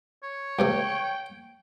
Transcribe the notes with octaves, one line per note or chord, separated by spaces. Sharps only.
C#5
C#2 C3 A3 G5